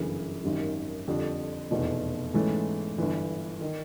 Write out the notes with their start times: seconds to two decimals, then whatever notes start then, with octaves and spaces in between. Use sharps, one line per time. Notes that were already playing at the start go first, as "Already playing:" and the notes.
Already playing: G1 F#2 C#3 E3
0.44 G#1 F#2 D#3 G3
1.07 F2 D3 G3
1.71 F1 E2 B2
2.34 G#2 E3 A3 C#4
2.98 G1 G2 E3
3.61 D#3